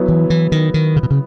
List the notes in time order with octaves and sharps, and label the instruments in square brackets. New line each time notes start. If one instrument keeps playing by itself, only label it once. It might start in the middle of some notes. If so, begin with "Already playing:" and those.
Already playing: [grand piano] F#3 B3 E4
[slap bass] E3
E3
D#3
D#3
C#3
B2
C#3